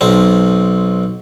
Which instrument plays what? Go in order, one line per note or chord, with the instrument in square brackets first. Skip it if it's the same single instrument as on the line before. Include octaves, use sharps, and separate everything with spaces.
[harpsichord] B1 C4